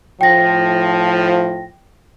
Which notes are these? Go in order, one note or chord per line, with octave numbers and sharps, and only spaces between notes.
A2 F3 G5 A#6